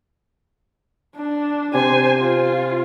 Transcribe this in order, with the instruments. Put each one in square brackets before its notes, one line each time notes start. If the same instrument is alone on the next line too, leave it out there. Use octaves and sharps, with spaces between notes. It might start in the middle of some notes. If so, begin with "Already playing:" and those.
[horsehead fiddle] D4
[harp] C3 [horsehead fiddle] C5 G#5
[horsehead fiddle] F4